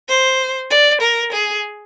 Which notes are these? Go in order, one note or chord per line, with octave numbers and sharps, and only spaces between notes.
C5
D5
A#4
G#4